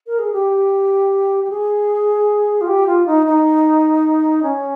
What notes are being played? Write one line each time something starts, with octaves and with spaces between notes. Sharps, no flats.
A#4
G#4
G4
G4
G#4
F4
G4
F4
D#4
D#4
C#4